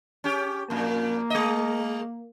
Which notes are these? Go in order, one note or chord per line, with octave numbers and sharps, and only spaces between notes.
C#4 G4
F2 A#2 A#3
G#3 D#5